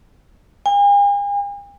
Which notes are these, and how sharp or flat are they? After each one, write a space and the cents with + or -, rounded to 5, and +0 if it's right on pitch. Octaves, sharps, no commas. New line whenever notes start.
G#5 -45